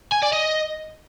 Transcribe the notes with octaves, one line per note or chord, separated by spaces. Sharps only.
G#5
D5
D#5